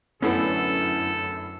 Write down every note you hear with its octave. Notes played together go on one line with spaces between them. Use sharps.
F#2 A2 D3 B3 C#4 E4 A4